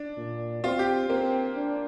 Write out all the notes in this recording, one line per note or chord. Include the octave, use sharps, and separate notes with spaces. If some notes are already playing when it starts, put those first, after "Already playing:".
Already playing: D4
A#2
C4 F4
G4
A#3 C4
D4